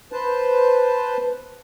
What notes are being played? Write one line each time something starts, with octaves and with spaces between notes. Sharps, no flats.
B4 C5 A5